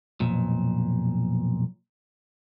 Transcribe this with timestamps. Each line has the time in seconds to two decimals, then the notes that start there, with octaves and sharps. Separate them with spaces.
0.20 B1 F2 A#2